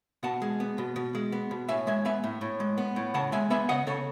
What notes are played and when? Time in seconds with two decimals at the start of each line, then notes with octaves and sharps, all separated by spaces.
0.23 B2 F#5 A5
0.42 G#3
0.60 B3
0.78 B2
0.96 B2
1.15 G#3
1.32 B3
1.51 B2
1.69 A2 E5 G#5
1.87 G#3 E5 G#5
2.05 B3 E5 G#5
2.24 A2
2.41 A2
2.60 G#3
2.78 B3
2.96 A2
3.14 C#3 F#5 A5
3.32 G#3 E5 G#5
3.50 B3 E5 G#5
3.69 C#3 D#5 F#5
3.87 C#3 A4 C#5